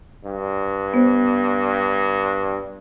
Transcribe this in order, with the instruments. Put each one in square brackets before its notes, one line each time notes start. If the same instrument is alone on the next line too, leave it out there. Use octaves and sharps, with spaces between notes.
[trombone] G2
[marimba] B3 C5